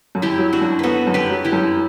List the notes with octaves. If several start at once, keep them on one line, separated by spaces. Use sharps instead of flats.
F#2
E4 G4
F#3
D4 F#4
F#2
B3 F#4 A4 B4
F#2
G4 B4
F#3
E4 G4
F#2